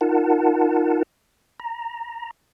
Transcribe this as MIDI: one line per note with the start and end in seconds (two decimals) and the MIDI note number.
0.01 1.03 63
0.01 1.03 65
0.01 1.03 70
0.01 1.03 78
0.01 1.03 81
1.60 2.31 82